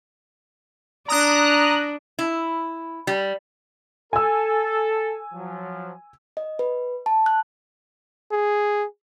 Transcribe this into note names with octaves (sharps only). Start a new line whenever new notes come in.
D4 A#5 D#6 F#6
E4
G3
A4 G#5 E6
F3 F#3
D#5
B4
A5
F#6
G#4